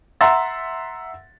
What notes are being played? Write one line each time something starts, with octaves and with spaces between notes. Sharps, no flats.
E5 F#5 A#5 C6 E6 A6